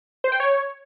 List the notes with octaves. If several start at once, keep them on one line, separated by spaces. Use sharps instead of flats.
C5
G5
C#5